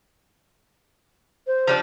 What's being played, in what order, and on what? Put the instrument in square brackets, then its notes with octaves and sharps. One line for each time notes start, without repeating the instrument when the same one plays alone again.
[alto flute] C5
[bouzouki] F3 G3 D4